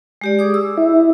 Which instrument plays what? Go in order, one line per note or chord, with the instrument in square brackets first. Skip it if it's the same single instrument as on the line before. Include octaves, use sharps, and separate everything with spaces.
[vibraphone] G#3 G4 D5
G#4 D6 D#6
E6
[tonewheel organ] E4